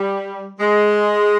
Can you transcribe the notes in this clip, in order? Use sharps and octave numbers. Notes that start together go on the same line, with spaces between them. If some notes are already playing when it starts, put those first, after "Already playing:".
Already playing: G3
G#3